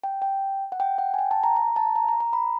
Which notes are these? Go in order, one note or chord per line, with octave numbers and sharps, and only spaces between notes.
G5
G5
F#5
G5
F#5
G#5
G5
A5
A#5
A#5
A5
A#5
A#5
A#5
B5